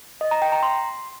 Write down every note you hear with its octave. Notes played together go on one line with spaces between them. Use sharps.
D#5
A#5
G5
A#5
C6